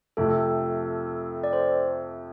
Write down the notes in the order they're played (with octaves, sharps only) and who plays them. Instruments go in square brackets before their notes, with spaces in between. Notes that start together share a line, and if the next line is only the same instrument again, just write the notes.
[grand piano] F2 C3 F3 A3 [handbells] A4
[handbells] D5
C5